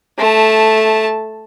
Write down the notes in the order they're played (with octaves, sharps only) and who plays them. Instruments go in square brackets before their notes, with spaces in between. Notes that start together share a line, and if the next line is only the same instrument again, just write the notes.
[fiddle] A3 A5